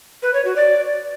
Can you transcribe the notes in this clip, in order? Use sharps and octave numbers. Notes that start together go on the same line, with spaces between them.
B4
C#5
F#4
D5